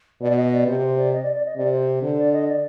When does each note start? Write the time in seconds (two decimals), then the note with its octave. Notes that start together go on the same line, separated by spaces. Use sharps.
0.21 B2 D5
0.36 D#5
0.52 D5
0.67 C3 C5
0.83 C5
0.98 D5
1.12 D#5
1.23 D5
1.34 D5
1.45 D#5
1.57 C3 D5
1.72 C5
2.02 D3 C5
2.17 D5
2.33 D#5
2.48 D5